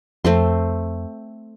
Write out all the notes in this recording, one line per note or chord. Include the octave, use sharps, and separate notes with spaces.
F2 A3 C4 C6